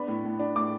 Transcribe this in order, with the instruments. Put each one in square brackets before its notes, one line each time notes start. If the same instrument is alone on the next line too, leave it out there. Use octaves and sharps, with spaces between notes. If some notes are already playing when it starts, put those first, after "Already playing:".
Already playing: [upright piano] B3 D4 B5
A2
A2
D4
A2 D6